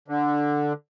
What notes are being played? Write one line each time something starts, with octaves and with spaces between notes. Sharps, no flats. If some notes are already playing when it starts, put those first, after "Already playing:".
D3